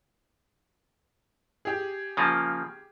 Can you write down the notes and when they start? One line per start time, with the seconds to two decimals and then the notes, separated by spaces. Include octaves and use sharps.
1.65 G4 G#4
2.17 C#3 F3 A#3